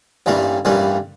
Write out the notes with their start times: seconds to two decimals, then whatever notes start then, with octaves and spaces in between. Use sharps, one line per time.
0.26 A1 G2 E3 G3 A#3
0.65 A1 G2 E3 G3 A#3